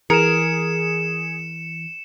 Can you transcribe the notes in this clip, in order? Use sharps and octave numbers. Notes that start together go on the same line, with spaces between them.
E3 G#4 A#4 C#7 E7